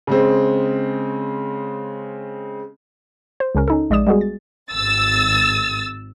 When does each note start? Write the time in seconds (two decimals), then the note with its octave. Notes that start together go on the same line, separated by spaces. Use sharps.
0.07 C#3 G#3 C4
3.40 C5
3.55 C#2 C#3 C#4 A#4
3.68 C#4 D#4 A4
3.90 A#1 G#3 D5 E5 D#6 E7
4.07 G3 G#3 B3 F#4 G#4
4.21 A6
4.72 G#1 E6 A6